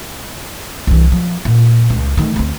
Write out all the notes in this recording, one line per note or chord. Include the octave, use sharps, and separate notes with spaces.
C2 E3
F3
A#2
C#2
D#3 A3
D2 C4